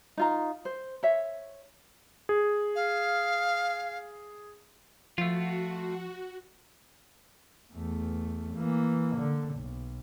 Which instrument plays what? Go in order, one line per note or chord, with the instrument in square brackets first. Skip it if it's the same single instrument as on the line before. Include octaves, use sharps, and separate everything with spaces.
[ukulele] D#4 F4 A#5
C5
C#5 E5
[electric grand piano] G#4
[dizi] F5
[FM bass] F3 [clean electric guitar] A3 F4 [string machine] F#4
[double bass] E2 A3
E3 A#3
D3
B1